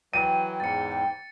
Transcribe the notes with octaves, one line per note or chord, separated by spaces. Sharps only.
E3 F#3 G5 D#7
E2 G#2 A6 C#7